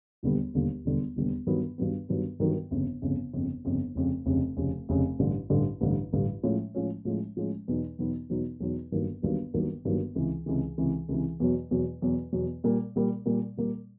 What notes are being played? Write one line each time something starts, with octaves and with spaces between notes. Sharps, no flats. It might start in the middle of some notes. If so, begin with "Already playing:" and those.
E1 D#2 D3 G3 B3
E1 D#2 D3 G3 B3
E1 D#2 D3 G3 B3
E1 D#2 D3 G3 B3
G2 D#3 F#3 B3
G2 D#3 F#3 B3
G2 D#3 F#3 B3
G2 D#3 F#3 B3
G1 F2 C#3
G1 F2 C#3
G1 F2 C#3
G1 F2 C#3
F1 F2 C#3
F1 F2 C#3
F1 F2 C#3
F1 F2 C#3
A1 G2 D3
A1 G2 D3
A1 G2 D3
A1 G2 D3
A2 F3 G#3 C#4
A2 F3 G#3 C#4
A2 F3 G#3 C#4
A2 F3 G#3 C#4
E2 B2 F#3 B3 D#4
E2 B2 F#3 B3 D#4
E2 B2 F#3 B3 D#4
E2 B2 F#3 B3 D#4
G1 G2 D#3 F#3 A#3
G1 G2 D#3 F#3 A#3
G1 G2 D#3 F#3 A#3
G1 G2 D#3 F#3 A#3
C#2 C3 E3
C#2 C3 E3
C#2 C3 E3
C#2 C3 E3
E2 B2 F#3
E2 B2 F#3
E2 B2 F#3
E2 B2 F#3
A#2 G3 A#3
A#2 G3 A#3
A#2 G3 A#3
A#2 G3 A#3